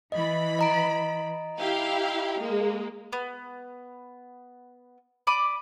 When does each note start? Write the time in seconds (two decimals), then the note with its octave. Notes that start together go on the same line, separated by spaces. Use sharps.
0.12 E3 D#5 B5
0.59 D#5 A#5 D7
1.59 E4 G4 F5
2.40 G#3 A#3
3.13 B3
5.27 D5 B5 D6 D#6